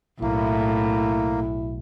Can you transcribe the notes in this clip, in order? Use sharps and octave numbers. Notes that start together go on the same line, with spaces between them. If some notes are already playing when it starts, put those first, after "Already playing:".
B1 A2 A#3 E4